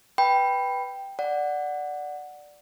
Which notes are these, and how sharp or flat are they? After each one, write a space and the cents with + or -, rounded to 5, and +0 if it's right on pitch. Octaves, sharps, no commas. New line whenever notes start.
B4 +0 G5 +0 B5 +0
D5 +0 F#5 +0